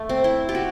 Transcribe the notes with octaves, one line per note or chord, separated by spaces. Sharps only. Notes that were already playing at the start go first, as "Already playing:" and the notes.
Already playing: A3
C4
E4
G4
F#4